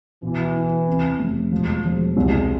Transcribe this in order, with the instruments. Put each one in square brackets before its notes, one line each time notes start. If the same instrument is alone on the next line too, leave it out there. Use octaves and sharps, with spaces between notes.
[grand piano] B2 [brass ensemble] E3
[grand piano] E4
C3
F1
[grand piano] E1 [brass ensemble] F3
[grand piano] E1
[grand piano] C2 [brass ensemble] G#3